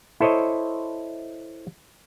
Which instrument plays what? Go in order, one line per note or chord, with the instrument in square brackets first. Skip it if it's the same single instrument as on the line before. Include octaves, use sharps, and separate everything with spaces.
[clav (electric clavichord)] E4 A4 C5 C#5 D#5